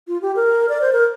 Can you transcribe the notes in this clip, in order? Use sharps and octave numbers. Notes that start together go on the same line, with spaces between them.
F4
G4
A#4
D5
C5
A#4